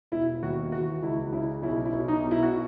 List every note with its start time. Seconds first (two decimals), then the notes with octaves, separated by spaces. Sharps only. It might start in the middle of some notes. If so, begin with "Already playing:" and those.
0.12 E1 E4
0.43 D#2 F#4
0.72 E3 F#4
1.02 C#2 E4
1.32 C#3 E4
1.62 B1 E4
1.85 E4
1.93 B1
2.08 D#4
2.23 B2
2.31 E4
2.42 F#4